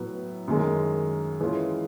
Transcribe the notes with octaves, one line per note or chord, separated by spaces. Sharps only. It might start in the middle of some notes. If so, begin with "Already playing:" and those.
Already playing: A2 F#3 B3
F#2 D#3 G#3
E3 G#3 C#4 F4